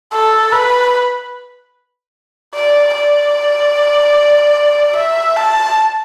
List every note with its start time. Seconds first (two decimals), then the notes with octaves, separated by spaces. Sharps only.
0.12 A4
0.52 B4
2.54 D5
2.94 D5
4.96 E5
5.37 A5